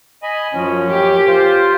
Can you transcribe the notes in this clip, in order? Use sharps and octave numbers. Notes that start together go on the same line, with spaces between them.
D#5 G#5 B5
F#2 F3 C#4
G4
F4 C5